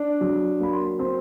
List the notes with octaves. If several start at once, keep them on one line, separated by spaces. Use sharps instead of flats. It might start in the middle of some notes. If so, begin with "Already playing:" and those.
Already playing: D4
F#3
A#3 B5
C6
C4 C6